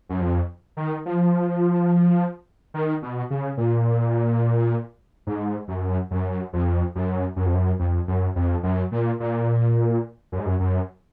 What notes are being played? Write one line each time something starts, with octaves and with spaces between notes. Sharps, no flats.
F#2
F2
D#3
F3
D#3
B2
C#3
A#2
G#2
F#2
F#2
F2
F#2
F#2
F2
F#2
F2
F#2
F2
F#2
A#2
A#2
F#2
G#2
F#2
F#2